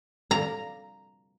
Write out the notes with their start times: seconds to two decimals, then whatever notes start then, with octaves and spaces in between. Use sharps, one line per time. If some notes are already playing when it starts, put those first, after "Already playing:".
0.31 A#5